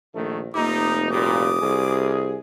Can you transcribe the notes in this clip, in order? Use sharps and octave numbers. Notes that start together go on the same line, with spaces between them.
A#1 D#3 A3
F1 F3 G3 A#3 D#4 D6
G2 A#2 F#4 G4 D6 D#6
C2 G#4